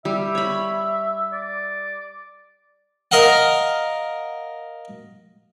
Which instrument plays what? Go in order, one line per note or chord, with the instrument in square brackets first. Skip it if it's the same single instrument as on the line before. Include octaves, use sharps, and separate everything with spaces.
[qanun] G3 [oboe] E5
[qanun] C#5 B5
[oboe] D5
[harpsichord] A#4 D#5 F5 F#5